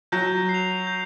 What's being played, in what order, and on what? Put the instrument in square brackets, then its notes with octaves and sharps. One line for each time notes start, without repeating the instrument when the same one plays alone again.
[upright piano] F#3 [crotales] G6
[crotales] C7
F7
G6